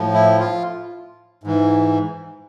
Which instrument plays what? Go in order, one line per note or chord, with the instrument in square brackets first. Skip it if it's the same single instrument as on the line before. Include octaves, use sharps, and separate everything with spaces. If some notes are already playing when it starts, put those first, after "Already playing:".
Already playing: [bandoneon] A2 F3
E4
F4
G#2 E3